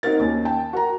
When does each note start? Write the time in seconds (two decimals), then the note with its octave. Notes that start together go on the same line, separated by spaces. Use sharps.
0.03 C4 D#4 F#4 A#4 A6
0.19 D#2 C#4
0.45 G5 A5
0.73 F#4 A#4 A#5